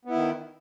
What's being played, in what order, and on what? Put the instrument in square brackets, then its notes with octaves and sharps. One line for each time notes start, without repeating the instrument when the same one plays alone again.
[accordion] B3
E4
D#3